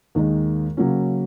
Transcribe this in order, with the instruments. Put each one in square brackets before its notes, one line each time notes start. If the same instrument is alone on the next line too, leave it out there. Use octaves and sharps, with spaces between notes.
[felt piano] D#2 D#3 G#3 D#4
C#3 F#3 A#3 C#4